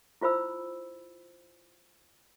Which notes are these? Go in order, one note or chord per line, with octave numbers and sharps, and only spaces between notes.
E4 F4 C5 B5 E6